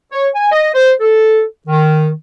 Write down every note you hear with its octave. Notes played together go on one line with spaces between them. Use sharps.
C#5
G#5
D#5
C5
A4
D#3